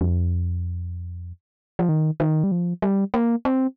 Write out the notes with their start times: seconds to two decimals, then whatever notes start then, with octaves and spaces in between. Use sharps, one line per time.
0.01 F2
1.79 F3
1.89 D#3
2.20 D#3
2.44 G3
2.52 F3
2.82 G3
3.14 A#3
3.45 C4